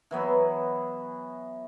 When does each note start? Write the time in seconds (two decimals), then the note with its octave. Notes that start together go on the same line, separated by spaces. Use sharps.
0.11 E3 F#3 B3